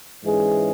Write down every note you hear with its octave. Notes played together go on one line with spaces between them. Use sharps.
G#2 E3 G#3 C#4 G#4